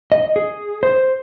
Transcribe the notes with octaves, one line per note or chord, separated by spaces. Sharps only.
D#5
G#4
C5